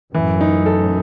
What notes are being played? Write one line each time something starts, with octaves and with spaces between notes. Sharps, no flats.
F#2 A2 E3
D#4
A4